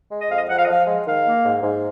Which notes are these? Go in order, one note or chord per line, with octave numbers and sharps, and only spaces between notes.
G#3
D#5
F2 F5
D#5
F2 F#5
F5
D#5
F3 F5
G#3
D#3 F5
A#3
G#2
G#2